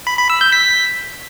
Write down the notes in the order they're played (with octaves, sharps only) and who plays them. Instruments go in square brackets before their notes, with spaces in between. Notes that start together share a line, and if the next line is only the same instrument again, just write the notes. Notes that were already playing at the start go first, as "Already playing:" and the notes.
[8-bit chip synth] B5
B5
E6
G6
B6